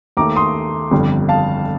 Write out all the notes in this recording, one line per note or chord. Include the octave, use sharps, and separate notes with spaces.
D#2 D#3 A3 A#5 D6
C6 D#6
G1 F2 D3 G3
F5 A5